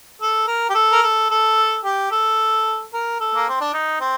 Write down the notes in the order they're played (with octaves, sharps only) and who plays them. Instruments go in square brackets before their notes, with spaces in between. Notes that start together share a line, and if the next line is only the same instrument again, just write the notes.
[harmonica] A4
A#4
G4
A4
A#4
A4
A4
G4
A4
A#4
A4
A#3
C4
D4
D#4
C4